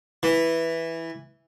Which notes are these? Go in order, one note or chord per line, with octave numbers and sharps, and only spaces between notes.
E3